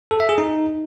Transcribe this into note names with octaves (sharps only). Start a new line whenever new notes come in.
A4
E5
G#4
D#4